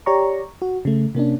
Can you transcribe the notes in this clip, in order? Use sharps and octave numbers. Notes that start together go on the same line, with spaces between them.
G4 C#5 D5 A#5 C#6
F#4
C#3 A3
C3 A#3 C#4 D4